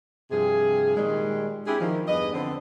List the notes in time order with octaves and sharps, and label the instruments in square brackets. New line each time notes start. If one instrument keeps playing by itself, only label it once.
[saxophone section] G2 C3 F3 G#4
A#2 D#3 G3 G#3
C4 D4 E4 G4 G#4
D#3 F3
E2 G2 B4 D#5
D3 F3 B3 C4 D4